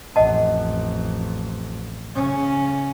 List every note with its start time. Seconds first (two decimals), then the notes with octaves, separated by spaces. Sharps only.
0.16 A1 F2 D#5 F#5 A5
2.16 C#3 C#4